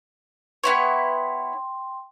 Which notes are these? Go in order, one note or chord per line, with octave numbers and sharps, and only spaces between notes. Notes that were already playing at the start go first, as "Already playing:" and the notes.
B3 E4 C#5 G5 C6